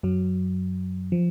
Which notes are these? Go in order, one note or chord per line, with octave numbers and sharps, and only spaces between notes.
F#2 F#3
F3